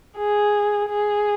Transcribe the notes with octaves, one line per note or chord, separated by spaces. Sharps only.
G#4
G#4